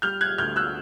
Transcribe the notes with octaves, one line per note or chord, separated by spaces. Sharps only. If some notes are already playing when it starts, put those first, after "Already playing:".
G3 F6 G6
F#6 G#6
D2 F6 G6
E6 F#6